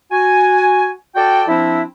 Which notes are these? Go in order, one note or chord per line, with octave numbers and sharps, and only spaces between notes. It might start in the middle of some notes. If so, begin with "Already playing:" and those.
F#4 G#5
F#4 A4 D5 G5
F3 C4 D4 E4